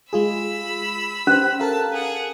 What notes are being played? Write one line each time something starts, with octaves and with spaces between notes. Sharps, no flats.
G#3 F4 G#4 B5 E6
C#4 G4 B4 C5
A4 A#4 F5 A5
G#4 F#5